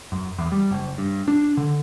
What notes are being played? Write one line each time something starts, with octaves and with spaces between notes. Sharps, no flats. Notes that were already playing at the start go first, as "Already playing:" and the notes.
F#2
E2
G3
F#1
G2
D4
D3